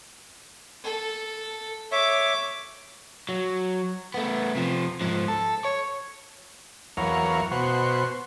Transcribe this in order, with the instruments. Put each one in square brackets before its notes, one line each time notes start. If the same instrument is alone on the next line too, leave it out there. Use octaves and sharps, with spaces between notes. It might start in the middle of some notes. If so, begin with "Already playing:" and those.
[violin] A4
[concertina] C#5 E5 [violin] D6
[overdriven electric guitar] F#3
A3 B3
C3 F3
G#2 F3
A4
C#5
[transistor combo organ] E2 F#3 A#4 C#5 F5
B2 F#4 C5